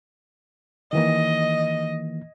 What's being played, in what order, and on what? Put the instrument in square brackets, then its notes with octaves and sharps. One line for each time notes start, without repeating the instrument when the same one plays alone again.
[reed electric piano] D#3 E3 A#3 [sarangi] D#5